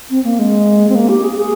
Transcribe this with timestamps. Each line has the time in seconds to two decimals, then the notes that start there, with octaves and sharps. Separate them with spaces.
0.10 C4
0.24 A#3
0.39 G#3
0.89 C4
0.95 A#3
1.09 G4
1.24 G#4
1.37 G#4